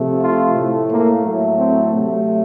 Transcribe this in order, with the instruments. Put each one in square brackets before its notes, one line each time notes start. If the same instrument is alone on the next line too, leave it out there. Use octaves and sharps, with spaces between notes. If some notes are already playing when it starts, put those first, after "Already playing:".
Already playing: [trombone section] C3 F3 A3
F4
A2 A3
A#3
A2 F#3 A3
C4
C3 F#3 A3